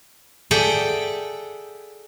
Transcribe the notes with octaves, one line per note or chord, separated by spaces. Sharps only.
G#4 A4 D5 E5 F#5 G5